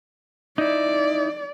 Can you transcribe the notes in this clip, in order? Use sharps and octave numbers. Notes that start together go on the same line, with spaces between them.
D#4 E4 D5